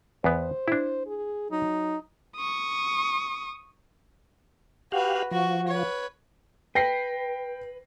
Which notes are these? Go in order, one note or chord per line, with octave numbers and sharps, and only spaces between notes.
E2 B3 C5
D4 E4
G#4
F#3 D#4
C#6 D#6
F#4 G4 B4 F5 F#5
F3 F#4 C#6
B4 C#5
B4 G5 A#6 C7